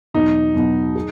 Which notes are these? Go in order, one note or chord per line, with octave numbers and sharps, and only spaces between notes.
E2 B2 F#3 B3 D#4
E2 B2 F#3 B3
G#4